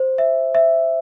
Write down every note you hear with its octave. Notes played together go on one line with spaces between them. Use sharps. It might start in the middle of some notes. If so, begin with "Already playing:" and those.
Already playing: C5
E5
E5